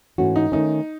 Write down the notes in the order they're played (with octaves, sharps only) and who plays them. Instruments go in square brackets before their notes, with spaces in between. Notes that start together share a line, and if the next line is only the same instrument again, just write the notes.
[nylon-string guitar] G#2 E3 A3 C#4 F#4
[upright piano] D#4
[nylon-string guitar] D#3 A3 C#4 [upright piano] D#4